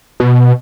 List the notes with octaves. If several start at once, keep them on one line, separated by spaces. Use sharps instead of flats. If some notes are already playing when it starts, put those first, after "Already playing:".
B2